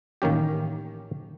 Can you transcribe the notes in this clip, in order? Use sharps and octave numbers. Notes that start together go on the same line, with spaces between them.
A1 D#3 A#3 C#4 G4